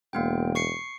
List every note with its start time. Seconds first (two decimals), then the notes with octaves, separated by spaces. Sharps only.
0.13 E1 A#3 B3 G5
0.55 C#6 C7 C#7